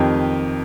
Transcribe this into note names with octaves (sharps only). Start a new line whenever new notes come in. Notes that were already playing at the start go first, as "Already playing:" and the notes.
Already playing: F2 D#3 G4